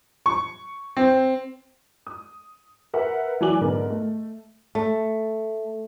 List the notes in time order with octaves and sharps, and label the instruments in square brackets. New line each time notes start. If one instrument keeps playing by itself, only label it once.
[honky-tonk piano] C#6
C4
D#6
A#4 B4 E5 F#5
E3 F#3 D5 G#5 D6 F#7
G#2 D3 B3 A#4
A3
[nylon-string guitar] A3